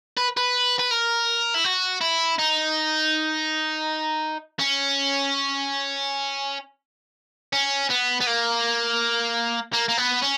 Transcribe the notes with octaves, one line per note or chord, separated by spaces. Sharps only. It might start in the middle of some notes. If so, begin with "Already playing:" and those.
B4
B4
B4
A#4
E4
F#4
E4
D#4
C#4
C#4
B3
B3
A#3
A#3
A#3
B3
C#4